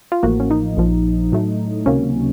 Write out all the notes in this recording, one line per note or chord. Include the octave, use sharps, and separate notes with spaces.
F4
A1 A2 F3 A#3 F#4
C#4
D#4
A#1 A#2 F3
A2 F#3 A3
C#2 C3 D#3 F#3 A#3 C#4